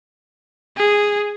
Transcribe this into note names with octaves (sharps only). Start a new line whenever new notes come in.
G#4